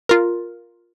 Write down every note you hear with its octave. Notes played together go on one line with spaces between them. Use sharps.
F4 A#4